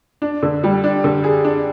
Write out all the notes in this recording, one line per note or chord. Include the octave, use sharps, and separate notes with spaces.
D4
D3
G3
D4
D3
G#4
D4